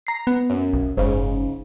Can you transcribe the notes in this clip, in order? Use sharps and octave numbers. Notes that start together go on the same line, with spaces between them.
A#5 C7
B3
F#2
B1
F#1 G#2 C#3